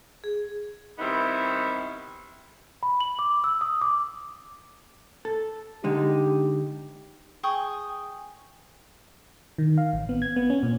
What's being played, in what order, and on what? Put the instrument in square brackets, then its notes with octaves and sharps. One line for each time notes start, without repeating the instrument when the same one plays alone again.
[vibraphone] G#4
[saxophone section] D#3 G3 B3 C4 D#4 E4
[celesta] B5
F#7
D6
E6
D#6
D6
[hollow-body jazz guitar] A4
[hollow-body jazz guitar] D3 G#3 D#4 [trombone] G4
[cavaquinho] G#4 G5 C#6 D#6
[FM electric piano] D#3
F5
A1
B3
G#6
B3
C#4
A#2